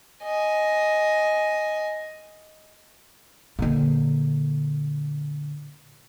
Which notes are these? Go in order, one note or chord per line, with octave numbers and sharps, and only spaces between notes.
D#5 G#5
A#2 D3